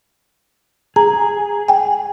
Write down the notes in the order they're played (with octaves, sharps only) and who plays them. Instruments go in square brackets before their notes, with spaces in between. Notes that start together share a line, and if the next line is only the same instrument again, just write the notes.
[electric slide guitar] G#4 [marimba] A#5
[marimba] G5 G#5